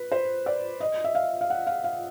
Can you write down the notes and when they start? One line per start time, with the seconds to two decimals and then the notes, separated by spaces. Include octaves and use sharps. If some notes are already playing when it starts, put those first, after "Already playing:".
Already playing: B4
0.12 C5
0.46 D5
0.80 D#5
1.04 E5
1.15 F5
1.41 F5
1.50 F#5
1.67 F5
1.84 F5